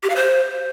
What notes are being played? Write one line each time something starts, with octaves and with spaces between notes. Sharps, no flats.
G4
F5
C5